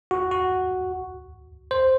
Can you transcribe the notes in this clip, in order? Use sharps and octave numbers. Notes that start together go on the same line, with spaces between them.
F#4
F#4
C5